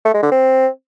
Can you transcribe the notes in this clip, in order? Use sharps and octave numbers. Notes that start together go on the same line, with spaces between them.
A3
G#3
D3
C4